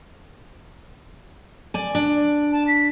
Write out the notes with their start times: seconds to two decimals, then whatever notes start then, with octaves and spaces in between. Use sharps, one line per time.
1.74 D5 G#5
1.95 D4
2.52 A5
2.67 B6